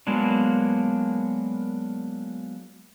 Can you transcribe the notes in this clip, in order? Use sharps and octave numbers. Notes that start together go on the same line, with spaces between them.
F#3 G#3 A#3 B3 D4